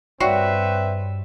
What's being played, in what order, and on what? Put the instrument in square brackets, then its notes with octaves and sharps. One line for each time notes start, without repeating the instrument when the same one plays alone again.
[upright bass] G2 [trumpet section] C4 B4 E5 [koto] F#4 [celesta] C#5 D5 G5